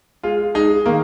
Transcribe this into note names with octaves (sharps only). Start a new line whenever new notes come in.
G#3 F4
G#3 D#4
D#3 A#3